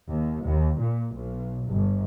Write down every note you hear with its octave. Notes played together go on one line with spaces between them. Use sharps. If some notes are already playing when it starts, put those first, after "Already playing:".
D#2
D#2
A#2
B1
G1